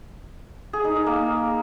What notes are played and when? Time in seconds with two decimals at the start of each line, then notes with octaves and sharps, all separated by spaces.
0.73 G#4
0.84 D#4
0.95 A#4
1.06 A#3